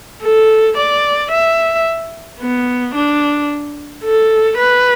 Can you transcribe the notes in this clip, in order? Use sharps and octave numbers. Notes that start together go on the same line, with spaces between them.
A4
D5
E5
B3
D4
A4
B4